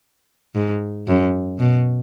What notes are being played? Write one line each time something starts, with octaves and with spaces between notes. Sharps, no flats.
G#2
F#2
B2